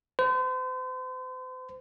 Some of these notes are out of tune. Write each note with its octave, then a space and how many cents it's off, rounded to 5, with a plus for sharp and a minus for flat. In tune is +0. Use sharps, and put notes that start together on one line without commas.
C5 -40